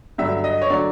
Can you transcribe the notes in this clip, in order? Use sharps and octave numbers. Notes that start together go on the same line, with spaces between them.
G2 D3 F#3 E5
D#5
C#5
D3 F#3 D5